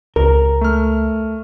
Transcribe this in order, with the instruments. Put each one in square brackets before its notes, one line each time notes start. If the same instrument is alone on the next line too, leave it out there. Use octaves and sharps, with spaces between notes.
[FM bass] C#2 [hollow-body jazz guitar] A#4
[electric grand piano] A3 F6